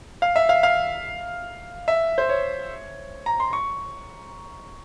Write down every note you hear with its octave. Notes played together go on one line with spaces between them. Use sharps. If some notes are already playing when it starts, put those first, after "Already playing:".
F5
E5
F5
F5
E5
C5
C#5
A#5
C6
C#6